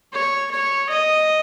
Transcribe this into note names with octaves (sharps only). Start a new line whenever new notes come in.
C#5
C#5
D#5